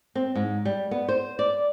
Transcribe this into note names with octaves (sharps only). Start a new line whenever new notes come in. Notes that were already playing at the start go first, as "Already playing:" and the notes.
C4
G#2
G3
B3
C5
D5